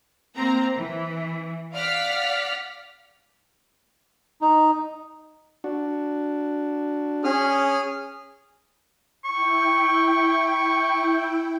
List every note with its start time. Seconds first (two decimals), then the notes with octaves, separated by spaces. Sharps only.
0.35 A#3 C4 A#5
0.75 E3
1.73 D5 F5 F#5 F6 B6
4.41 D#4
5.64 D4 F#4
7.24 C#4 G#4 D#6 F6
9.25 E4 G5 C#6